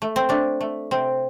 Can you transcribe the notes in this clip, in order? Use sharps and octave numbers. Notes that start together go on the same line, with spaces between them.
A3
C4
A3 D4
A3
C3 C4